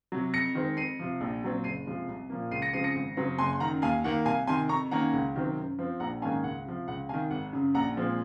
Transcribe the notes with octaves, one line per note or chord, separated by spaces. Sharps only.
C3 F#3
F2 A#6 C#7
D#3 G#3 C4
F2 C7 D#7
C3 F3
A#1
A#2 F#3 C4
F#1 C7 D#7
F2 C3 F3 G#3
C2
A#2 F3 A#3
C#2 C7 D#7
A#6 C#7
C#3 F3 G#3 C4 C7 D#7
A#6 C#7
G#1
F#2 C#3 F#3 C4
F#1 G#5 C6
C6
F#2 D#3 F#5 A#5
D#2 F5 G#5
D#3 A#3 F#5
C2 F5 G#5
C3 D#3 G#5 C6
F2 A#5 C#6
D#3 A#3 C#4 F#5 A#5
C#2
C3 D#3 F#3 C4
F#2
F3 C4
A#1 F#5 A#5
G#2 D#3 A#3 C#4 F5 G#5
C#2 F#5
C3 F3
C#2 F#5
C3 D#3 F5 G#5
G#1 F#5
F#2 C#3
A#1 F#5 A#5
A#2 F3 G#3 C4